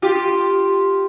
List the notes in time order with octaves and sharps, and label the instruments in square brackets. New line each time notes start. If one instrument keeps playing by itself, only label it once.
[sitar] F4 G4